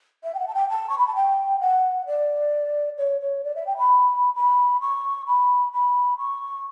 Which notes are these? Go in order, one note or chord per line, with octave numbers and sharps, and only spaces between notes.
E5
G5
F#5
A5
G5
A5
C#6
B5
A5
G5
F#5
D5
C#5
C#5
D5
E5
G5
B5
B5
C#6
B5
B5
C#6